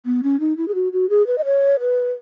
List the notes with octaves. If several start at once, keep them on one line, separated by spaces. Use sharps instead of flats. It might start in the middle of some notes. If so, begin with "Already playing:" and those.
B3
C#4
D#4
E4
G#4
F#4
F#4
G#4
B4
D#5
C#5
B4